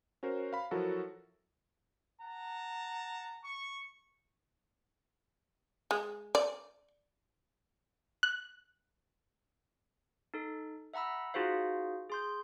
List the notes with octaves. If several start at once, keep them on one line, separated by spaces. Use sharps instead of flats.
C#4 F#4 A#4 C5
F5 B5
F3 F#3 E4 F#4 A4 A#4
F#5 A5 A#5
C#6
G#3
D5
F#6
D#4 A4
E5 F#5 A#5 B5 E6
D#4 F4 F#4 G#4 C5 F5
G#4 C6 G6